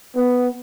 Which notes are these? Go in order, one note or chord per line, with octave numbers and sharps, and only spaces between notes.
B3